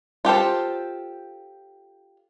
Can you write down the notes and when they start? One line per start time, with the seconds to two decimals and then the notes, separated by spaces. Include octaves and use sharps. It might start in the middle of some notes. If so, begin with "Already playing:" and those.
0.25 F4 G4 A4 C5